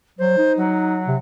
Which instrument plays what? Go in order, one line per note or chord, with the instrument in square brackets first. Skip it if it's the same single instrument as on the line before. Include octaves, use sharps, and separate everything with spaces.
[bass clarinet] F#3 [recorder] C5
[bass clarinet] D#4
[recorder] F#3
[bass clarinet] C3